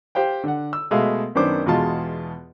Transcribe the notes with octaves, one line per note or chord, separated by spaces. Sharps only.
G4 C5 F5 G5
D3 F#5
E6
B2 G#3 A3 E5 F5 E6
F#2 D#3 B3 D4 C5 D6
E2 B2 G#3 F4 A5